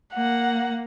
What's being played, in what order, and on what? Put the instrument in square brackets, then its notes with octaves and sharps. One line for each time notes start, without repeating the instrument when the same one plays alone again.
[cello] A#3 [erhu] F#5